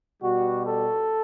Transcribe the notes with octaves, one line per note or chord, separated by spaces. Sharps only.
B2 G3 F#4
A4